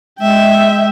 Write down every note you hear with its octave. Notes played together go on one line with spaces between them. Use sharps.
G#3 E5 G5